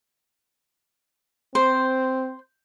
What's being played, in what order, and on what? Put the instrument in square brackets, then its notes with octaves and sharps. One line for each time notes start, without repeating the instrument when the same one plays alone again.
[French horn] C4 [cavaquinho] C5